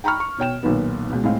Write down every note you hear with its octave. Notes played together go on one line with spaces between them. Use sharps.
G5 A#5 B5 C#6 F6
C#6
B2 C#5 G5 E7
B1 A#2 D#3 B3
C#2 B2
A2 G#3 C4 F5